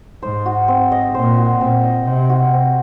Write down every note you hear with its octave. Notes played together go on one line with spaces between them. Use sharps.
G#2 C5
F#4
C4
D#5
A#2 C5
F#4
A#2 C4
D#5
C3 C5
F#4
C4